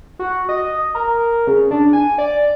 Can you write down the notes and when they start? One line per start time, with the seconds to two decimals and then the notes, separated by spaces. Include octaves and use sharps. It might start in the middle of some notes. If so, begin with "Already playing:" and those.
0.19 F#4
0.49 D#5
0.95 A#4
1.47 C#3
1.71 D4
1.93 G#5
2.18 D5